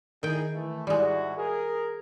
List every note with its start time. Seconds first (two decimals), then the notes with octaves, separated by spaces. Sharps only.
0.23 D#3 D#4 E4 G#4 G5
0.54 E3 A3
0.87 G#2 G3 G#3 E4 F#4
1.36 G#4 A#4